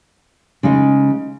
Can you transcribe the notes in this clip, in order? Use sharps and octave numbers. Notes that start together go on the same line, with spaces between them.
C#3 G#3 D#4